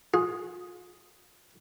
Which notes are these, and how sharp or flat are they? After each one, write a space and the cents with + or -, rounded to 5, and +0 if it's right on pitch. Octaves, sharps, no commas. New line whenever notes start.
F4 +35 G#4 +0